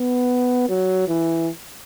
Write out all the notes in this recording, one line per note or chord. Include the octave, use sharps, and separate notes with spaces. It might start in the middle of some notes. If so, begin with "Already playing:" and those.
Already playing: B3
F#3
E3